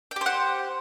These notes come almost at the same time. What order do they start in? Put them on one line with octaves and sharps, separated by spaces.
G5 G4 C5 F#5